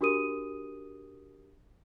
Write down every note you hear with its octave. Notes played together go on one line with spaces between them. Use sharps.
D4 F#4 G4 A#4 D#6 D#7